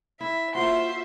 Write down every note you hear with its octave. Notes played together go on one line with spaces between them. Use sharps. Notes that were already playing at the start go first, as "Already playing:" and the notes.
E4 E5
A#3 F4 F#4 C5 E5 C6